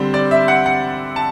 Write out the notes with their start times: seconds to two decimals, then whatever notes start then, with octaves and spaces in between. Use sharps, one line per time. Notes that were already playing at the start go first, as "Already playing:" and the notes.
Already playing: D3 G3 C4 C5
0.14 D5
0.31 E5
0.48 F#5
0.66 F#5
1.16 A5